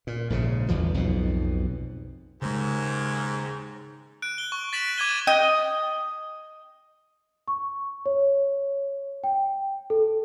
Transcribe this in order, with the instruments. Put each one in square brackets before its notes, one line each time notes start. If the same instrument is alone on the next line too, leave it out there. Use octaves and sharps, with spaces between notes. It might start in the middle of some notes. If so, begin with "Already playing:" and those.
[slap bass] A#2
A#1 G#2 C#3
G1 E2 E3 F3
B1 F2 G#2 B2
[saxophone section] D#2 G#2 [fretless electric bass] C#3 G#3
[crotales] F#6 D7
G7
C#6
A6 B6 D7 E7 F#7
D6 F#6 G#6 D#7 G7
[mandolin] D#5 [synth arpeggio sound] G5
[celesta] C#6
C#5
G5
A4